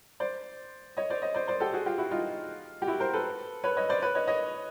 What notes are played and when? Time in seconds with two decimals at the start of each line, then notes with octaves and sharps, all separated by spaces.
0.20 C5 D5
0.97 C#5 D#5
1.10 C5 D5
1.22 C#5 D#5
1.34 C5 D5
1.47 C5 D5
1.60 G4 A4
1.73 F#4 G#4
1.86 F4 G4
1.98 E4 F#4
2.11 D#4 F4
2.82 G4
2.87 E4 F#4
3.00 A#4 C5
3.13 A4 B4
3.64 B4 C#5
3.77 C#5 D#5
3.89 C5 D5
4.02 B4 C#5
4.15 C#5 D#5
4.27 C#5 D#5